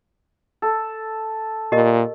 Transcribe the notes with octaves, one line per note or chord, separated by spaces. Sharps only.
A4
A#2 G4 A#4 D#5